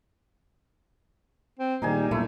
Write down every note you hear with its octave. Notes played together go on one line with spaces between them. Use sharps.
C4
A#2 D#3 G3 D#4 G#4 G#5
D#1 B1 A#2 A3 E4